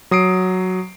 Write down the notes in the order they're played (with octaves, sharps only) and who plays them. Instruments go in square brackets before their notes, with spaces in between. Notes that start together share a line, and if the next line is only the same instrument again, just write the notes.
[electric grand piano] F#3 D#6 C7 D7